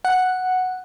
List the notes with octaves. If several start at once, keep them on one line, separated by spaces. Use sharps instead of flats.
F#5